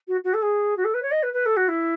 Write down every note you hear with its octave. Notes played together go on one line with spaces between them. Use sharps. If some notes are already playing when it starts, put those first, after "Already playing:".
F#4
F#4
A4
G#4
F#4
A4
B4
C#5
D#5
B4
B4
A4
F#4
E4